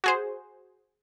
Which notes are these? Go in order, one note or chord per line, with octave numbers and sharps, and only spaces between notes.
F#4 G#4 C5